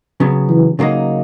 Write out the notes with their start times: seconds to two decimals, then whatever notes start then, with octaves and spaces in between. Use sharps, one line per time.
0.20 C#3 F#3 B3
0.50 E3
0.79 C#3 F#3 A#3 D#4